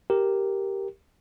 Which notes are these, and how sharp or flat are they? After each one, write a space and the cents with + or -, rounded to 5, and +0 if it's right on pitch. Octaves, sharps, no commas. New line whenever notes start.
G4 +0 A#4 +0